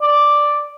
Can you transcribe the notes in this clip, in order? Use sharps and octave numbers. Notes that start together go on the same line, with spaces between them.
D5